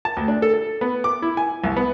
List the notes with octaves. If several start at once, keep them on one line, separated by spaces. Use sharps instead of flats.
A5
D2
D4
A4
A4
B3
D6
E4
G#5
C2
B3